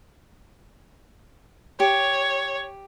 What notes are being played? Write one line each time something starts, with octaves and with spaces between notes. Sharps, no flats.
G4 C#5